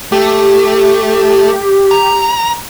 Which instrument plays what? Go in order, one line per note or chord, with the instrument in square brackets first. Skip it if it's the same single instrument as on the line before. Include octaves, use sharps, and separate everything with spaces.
[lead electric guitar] A3 [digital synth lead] G4
[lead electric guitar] A#5